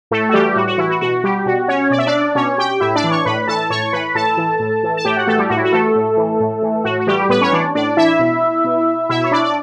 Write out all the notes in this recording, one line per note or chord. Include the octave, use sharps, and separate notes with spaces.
A2 A3 A4
F#4
E3 G3 G4
A2 F#4
F#4
E3 E4
F#4
B2 F#4
G3 G4
B2 F#4
C#4 C#5
B2 D5
E5
D4 D5
B2 C#4 C#5
G4 G5
A2 E4 E5
D4 D5
E3
C#5 C#6
A2 B4 B5
E3 A4 A5
A2 C#5 C#6
E3 B4 B5
A2 A4 A5
E3
A2
E3
A5
A2 G4 G5
F#4 F#5
E3 A3 A4
G3 G4
A2 F#4
E4
F#4
E3 A3 A4
A2
E3
A2
E3
A2 F#4
F#4
E3 G3 G4
A2 B3 B4
C#4 C#5
E3 D4 D5
A2 D4 D5
E3 E4 E5
B2
B2
B2 E4 E5
C#5
D4 D5
D5